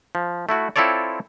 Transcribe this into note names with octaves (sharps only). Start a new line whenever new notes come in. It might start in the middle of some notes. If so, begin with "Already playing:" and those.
F3
A3 E4 F#4
C4 E4 F4 A4 C#5 D5